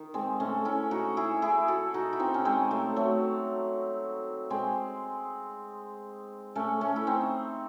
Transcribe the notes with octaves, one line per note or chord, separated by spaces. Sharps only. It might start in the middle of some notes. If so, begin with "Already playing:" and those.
Already playing: D#3
G#3 C4
A3 C#4
C#4 E4
D#4 F#4
E4 G#4
E4 G#4
F#4 A4
D#4 F#4
E4
C4 D#4
C#4
G#3 C4
F#3 A3
F#3 A3
G#3 C4
A3 C#4
A3 C#4
E4
C4 D#4